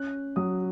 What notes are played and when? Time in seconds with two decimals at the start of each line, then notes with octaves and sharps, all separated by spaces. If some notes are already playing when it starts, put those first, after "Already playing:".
Already playing: C#4 F#6
0.36 F#3 D#6